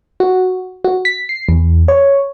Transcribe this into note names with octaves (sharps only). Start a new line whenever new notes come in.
F#4
F#4
B6
C7
E2
C#5